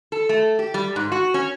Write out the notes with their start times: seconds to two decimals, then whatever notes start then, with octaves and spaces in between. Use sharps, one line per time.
0.12 A4
0.29 A3
0.59 G4
0.74 G3
0.96 G#2
1.12 F#4
1.34 C#4